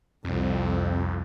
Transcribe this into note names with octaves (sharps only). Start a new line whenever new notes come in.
C2 F2